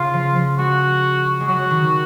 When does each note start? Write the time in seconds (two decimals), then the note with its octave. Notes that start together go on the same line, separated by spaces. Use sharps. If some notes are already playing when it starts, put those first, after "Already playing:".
Already playing: C#3 F4
0.14 F3
0.36 F3
0.58 G#3 F#4
1.40 G#3
1.48 F#3 F#4
1.71 D#3